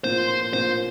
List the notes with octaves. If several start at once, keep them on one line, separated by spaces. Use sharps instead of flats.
A#1 A2 F3 A#3 F4 C5
A#1 A2 F3 A#3 F4 C5